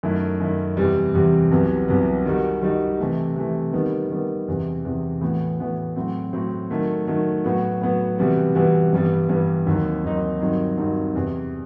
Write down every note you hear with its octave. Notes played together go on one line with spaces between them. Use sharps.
F#2 D#3 A3 E4
F#2 D#3 A3 E4
E2 C3 E3 G3
E2 C3 E3 G3
C2 C3 F#3 B3
C2 C3 F#3 B3
D#3 G3 D#4 F#4
D#3 G3 D#4 F#4
C3 E3 A3
C3 E3 A3
D#3 G3 B3
D#3 G3 B3
E2 C3 E3
E2 C3 E3
A2 E3 B3 F#4
A2 E3 B3 F#4
A2 F#3 C4 F#4
A2 F#3 C4 F#4
D#3 F#3 A3
D#3 F#3 A3
A2 F#3 B3 F#4
A2 F#3 B3 F#4
C3 E3 G3 B3 F#4
C3 E3 G3 B3 F#4
G2 E3 G3 B3
G2 E3 G3 B3
D#2 D#3 F#3 C4 D#4
D#2 D#3 F#3 C4 D#4
G2 D#3 F#3 C4 D#4
G2 D#3 F#3 C4 D#4
E2 C3 E3